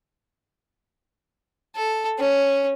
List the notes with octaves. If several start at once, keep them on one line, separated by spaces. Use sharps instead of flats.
A4
C#4